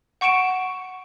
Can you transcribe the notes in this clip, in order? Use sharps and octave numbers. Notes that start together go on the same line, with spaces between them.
F#5 C#6 C#7 D7 E7